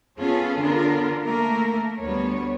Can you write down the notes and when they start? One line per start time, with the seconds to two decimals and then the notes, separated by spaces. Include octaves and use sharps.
0.18 B3 C#4 F4 G#4 A4
0.59 D3 B3 F4 A#4
1.23 A3 A#3 A#4
1.98 D2 G3 B3 C#5